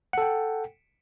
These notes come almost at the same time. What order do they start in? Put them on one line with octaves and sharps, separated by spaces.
F#5 A4 G5